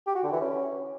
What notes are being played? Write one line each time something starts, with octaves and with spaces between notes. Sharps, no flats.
G4
F#4
D3
E3
C#4